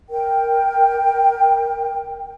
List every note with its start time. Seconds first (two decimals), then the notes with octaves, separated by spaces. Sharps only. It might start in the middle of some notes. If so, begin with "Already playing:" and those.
0.10 A#4 G5